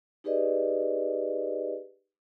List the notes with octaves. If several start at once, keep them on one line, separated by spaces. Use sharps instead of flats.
D#4 G4 G#4 B4 D5 D#5